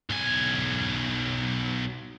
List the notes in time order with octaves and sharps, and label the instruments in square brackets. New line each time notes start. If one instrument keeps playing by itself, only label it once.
[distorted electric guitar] B1 G#5